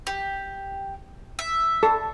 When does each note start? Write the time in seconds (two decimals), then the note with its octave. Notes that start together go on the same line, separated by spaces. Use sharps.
0.07 G4
1.39 E5
1.83 A4